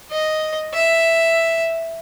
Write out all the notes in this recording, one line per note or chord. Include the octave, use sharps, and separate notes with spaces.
D#5
E5